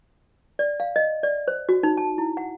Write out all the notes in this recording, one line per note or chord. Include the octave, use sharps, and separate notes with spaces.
D5
F5
D#5
D5
C5
F#4
D#4
A5
E4
F#5